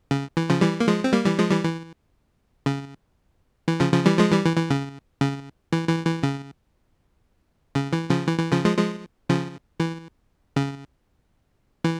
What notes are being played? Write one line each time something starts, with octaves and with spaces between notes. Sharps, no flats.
C#3
E3
C#3 F3
E3 G3
A#3
F3 G#3
C4
G3 A#3
E3 G3
F3 G#3
E3 G3
E3
C#3
E3
C#3 F3
C#3 F3
E3 G3
F3 G#3
E3 G3
E3
E3
C#3
C#3
E3
E3
E3
C#3
C#3
E3
C#3 F3
E3
E3
C#3 F3
F3 G#3
F3 G#3
C#3 F3
E3
C#3
E3